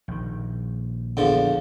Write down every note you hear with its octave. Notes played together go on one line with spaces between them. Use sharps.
A#1 D#3
E2 D3 F3